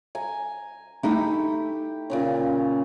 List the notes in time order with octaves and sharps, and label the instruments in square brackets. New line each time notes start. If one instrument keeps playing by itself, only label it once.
[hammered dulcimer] G#5 A#5
[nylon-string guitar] A3 D#4 E4 [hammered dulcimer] G4
[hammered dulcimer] A#2 C#3 C#4